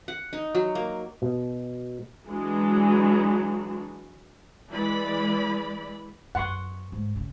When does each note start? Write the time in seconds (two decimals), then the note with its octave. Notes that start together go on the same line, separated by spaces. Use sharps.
0.08 F#5
0.33 D#4
0.55 F#3
0.75 A#3
1.22 B2
2.25 E3 F#3 G#3 D4 F#4
4.71 E3 G#3 D5 B5
6.35 F#2 F#5 C6 C#6
6.92 G#2
7.16 C#3